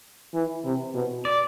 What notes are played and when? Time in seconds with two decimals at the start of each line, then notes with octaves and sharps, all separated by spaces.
0.34 E3
0.65 C3
0.95 B2
1.25 D5